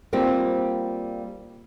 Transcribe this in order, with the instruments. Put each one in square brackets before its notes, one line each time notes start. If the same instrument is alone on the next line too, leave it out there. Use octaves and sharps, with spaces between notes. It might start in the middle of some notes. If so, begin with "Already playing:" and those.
[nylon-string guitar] G3 A#3 C4 F4